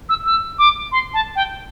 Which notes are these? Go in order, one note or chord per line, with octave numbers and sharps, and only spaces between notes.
E6
E6
D6
C6
A5
G5